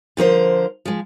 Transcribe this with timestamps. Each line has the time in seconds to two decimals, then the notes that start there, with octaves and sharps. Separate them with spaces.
0.17 D3 F3 A#4 C5
0.85 F3 G#3